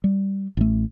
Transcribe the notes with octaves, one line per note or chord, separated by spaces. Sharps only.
G3
A1 A3